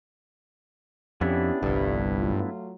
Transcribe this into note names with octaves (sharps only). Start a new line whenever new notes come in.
F2 B3 C#4 D4 E4 G4
G1 C2 G2 D3 F3 G3
F#3 A3 F4